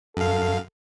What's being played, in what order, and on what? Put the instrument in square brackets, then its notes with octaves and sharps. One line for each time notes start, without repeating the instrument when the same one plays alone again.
[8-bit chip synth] F#2 F5 [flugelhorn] A4